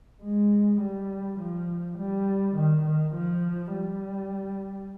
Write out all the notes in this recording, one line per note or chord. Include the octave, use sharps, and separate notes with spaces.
G#3
G3
F3
G3
D#3
D#3
F3
G3